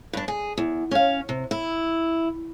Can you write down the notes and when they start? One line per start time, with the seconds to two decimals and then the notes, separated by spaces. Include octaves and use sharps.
0.13 G2 D4
0.28 G#4
0.58 E2
0.91 C#4 F5
1.29 C3
1.51 E4